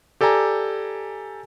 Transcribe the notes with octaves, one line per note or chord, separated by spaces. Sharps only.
G4 A4 D5 G#5 A#5